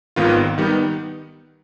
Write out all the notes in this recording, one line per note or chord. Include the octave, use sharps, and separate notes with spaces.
G#1 G#2 D#3 B3 F4
D#3 G3 B3 D#4